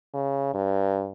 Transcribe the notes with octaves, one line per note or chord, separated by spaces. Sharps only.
C#3
G2